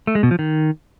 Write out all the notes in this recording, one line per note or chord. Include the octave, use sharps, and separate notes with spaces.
A3
G#3
B2
F3
D#3